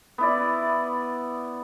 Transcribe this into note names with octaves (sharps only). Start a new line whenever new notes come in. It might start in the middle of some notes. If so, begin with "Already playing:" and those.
B3 E4 D5